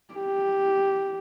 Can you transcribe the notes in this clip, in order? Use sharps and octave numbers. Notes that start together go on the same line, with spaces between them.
G4